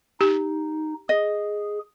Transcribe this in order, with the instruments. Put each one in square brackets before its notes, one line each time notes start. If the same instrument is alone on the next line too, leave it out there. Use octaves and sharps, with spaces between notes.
[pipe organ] D#4 [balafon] G4
[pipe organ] G#4 [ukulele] D#5